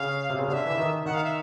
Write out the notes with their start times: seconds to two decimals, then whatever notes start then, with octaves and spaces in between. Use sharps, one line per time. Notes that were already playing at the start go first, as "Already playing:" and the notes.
Already playing: C#3 F5
0.30 C3
0.39 C#3
0.48 D3 F5
0.53 E5
0.66 E3
0.78 D#3
1.06 D#3 F#5
1.14 F5
1.24 E5